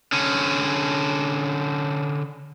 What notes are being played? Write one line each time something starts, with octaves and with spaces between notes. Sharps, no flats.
D3 C#4